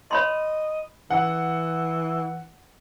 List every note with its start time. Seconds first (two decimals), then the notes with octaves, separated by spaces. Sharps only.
0.11 C#5 D#5 B5 C6
1.10 E3 F#5